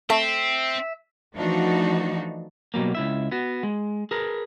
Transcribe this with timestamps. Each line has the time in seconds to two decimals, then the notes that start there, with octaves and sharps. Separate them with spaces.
0.10 A3 C4 E5
1.36 E3 F3 A3 D4 D#4 F#4
2.74 B2 F#3 G3 A#3
2.95 C#2 E4 E5
3.32 B3 F#4
3.63 G#3
4.11 G#4 A#4 B4